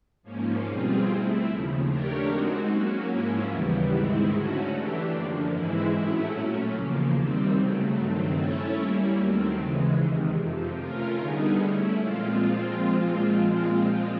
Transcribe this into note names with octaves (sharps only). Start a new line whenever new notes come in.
G#2 F3 A#3 C#4
B2 G3 C4 F4 G#4
A3 C4 E4
D#2 C#3 F3
A3 D4 G4 A#4 C#5
G#3 C4 D#4 F#4
F#3 A#3 C#4 F#4
G#2 F3 A#3 C#4 E4
D#2 C#3 E3 G3 B3
G#2 D#3 G#3 C4 E4
D3 F#3 A3 C#4 F#4
E3 A3 D4 G4
F#2 D3 F3 A#3
G#2 E3 G#3 C4 E4
A2 F#3 A3 C#4 E4
A#2 F#3 A3 C#4
E2 C#3 F3 A#3
C3 D#3 G3 C4
C#3 F#3 A3
G2 D#3 F#3 A3 C4
A3 C#4 E4 A4 C#5
G3 A#3 C#4 E4
D#2 D#3 F#3 A3 C4
C#3 E3 G#3
E2 C3 D#3
F2 C3 F3
A3 C#4 F4 A#4
D3 G3 B3 D#4 G#4
A3 C#4 E4
A#2 F3 G#3 C4 F4